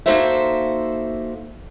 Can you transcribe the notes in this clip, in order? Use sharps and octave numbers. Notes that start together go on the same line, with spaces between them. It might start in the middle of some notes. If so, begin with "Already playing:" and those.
A#3 D#4 F#4 A4 C5 E5